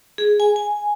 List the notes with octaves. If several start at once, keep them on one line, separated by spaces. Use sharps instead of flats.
G#4
G#5
G#5